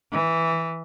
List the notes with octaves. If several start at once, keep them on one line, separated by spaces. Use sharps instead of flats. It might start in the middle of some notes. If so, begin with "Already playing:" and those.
E3